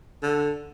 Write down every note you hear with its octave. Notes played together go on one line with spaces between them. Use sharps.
D3